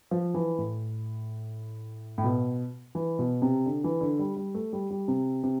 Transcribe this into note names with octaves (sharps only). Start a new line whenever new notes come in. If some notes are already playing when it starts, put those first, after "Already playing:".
F3
E3
A2
A2
B2
E3
B2
C3
D3
E3
D3
G3
G3
A3
G3
G3
C3
C3